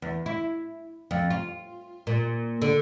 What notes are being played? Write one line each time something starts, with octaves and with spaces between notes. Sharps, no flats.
E2
E4
F2
F4
A#2
D3